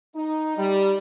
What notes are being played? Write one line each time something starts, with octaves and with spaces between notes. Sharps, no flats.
D#4
G3